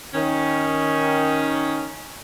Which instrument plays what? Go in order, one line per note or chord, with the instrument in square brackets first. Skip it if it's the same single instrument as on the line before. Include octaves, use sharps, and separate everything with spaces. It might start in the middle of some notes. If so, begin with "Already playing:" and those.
[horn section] D#3 C#4